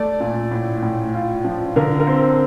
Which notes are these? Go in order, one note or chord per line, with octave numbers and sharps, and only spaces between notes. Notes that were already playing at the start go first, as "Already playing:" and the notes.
Already playing: A3 D5
A#2
A2
A2
F4
F3
D3 A#4
A#4
C4 C5